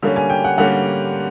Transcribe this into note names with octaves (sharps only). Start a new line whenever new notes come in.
D3 G3 A#3 C#4
G#5
G5
F#5
D3 G3 A#3 C#4 F#5